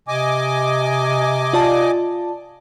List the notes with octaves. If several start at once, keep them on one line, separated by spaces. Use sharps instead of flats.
C3 D#5 G#5 D6
F4 D5 A5